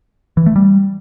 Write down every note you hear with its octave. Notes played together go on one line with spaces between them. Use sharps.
E3
A3
G3